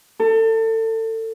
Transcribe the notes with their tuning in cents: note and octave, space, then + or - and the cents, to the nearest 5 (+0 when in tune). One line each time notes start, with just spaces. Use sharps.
A4 +30